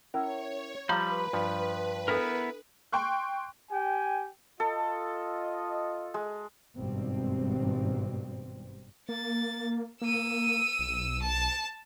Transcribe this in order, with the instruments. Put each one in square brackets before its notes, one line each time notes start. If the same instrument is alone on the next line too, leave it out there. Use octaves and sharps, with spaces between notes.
[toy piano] C#4 [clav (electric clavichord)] E4 A#4 [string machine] C#5
[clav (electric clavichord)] F3 G3 [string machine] B4 [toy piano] F5 A#5 [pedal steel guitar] B5 G6
[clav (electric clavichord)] G2 F3
[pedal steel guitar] B3 E4 A#4 [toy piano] D4 A4
[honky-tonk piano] G5 C6 C#6 F#6
[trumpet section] G4 G5 G#5
[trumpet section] F4 D#5 [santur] A4
[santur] G#3
[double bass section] G#1 G2 B2 G3 C4
[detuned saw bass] A#3 [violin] A6
[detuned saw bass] A#3 [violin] E6 D#7
[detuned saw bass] B1
[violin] A5